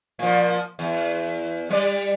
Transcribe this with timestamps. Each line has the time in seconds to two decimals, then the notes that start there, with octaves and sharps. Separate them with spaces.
0.19 A#2 F3
0.79 E2
1.70 G3 D5